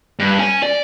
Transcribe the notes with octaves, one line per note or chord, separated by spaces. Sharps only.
G2
C#4 G#5
D5